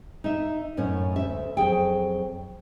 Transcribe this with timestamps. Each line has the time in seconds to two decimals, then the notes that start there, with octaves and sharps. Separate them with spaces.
0.24 D#4 D#5 E5
0.77 F#2 A2 C#4 C#5 F#5
1.16 D2 E5
1.57 F2 F#3 G#4 G5